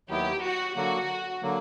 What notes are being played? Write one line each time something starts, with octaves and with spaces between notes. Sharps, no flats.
D#2 D#3 F#3 B3 E4 G4
F#4
D3 F#3 A#3 F#4
D3 F#3 A#3